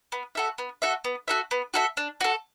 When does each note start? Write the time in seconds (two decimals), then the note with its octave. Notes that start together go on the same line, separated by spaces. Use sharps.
0.12 B3
0.35 F#4 A4 E5
0.58 B3
0.82 F#4 A4 E5
1.05 B3
1.28 F#4 A4 E5
1.51 B3
1.74 F#4 A4 E5
1.97 D4
2.21 F#4 A4